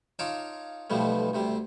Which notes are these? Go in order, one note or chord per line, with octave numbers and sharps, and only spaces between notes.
D#4 F4 C#5 A5 D6
B1 F2 B2 F3 G3 A3
D2 C3 G3